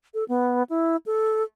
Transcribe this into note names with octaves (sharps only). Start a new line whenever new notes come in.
A4
B3
E4
A4